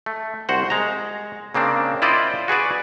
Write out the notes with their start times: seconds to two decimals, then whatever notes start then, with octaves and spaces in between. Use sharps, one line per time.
0.06 A3
0.49 C2 F#4 C5 F#5
0.70 G#3 A#5
1.55 C#3 A#3 C4 D4
2.02 E4 F4 C5 D5 D#5
2.48 F#4 G#4 B4 D5